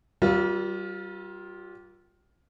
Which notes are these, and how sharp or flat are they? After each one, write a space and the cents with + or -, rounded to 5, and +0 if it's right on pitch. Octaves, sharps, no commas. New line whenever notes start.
G3 -30 F4 +15 A#4 +25